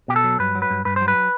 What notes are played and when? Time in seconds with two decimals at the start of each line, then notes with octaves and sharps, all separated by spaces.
0.08 B2 G4
0.16 A4
0.24 F#3
0.39 G2 B4
0.55 F#3
0.62 B4
0.70 G2
0.85 G2 B4
0.96 F#3 C5
1.08 B4